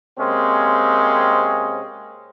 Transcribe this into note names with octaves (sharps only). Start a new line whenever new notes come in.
C3 G#3 A#3 C4 C#4